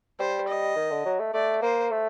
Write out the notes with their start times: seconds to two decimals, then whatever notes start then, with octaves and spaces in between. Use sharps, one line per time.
0.20 G3 C5
0.48 D#5
0.76 D#3
0.91 D3
1.05 F#3
1.20 A3
1.34 A3 D5
1.62 A#3 C5
1.91 A3